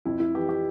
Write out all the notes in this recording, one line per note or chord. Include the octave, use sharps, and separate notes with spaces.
F2 E4
E4
E3 G4
G4